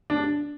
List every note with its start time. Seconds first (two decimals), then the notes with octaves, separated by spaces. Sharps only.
0.10 D4